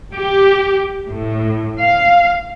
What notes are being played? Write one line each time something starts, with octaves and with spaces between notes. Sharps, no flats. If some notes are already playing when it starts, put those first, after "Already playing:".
G4
A2
F5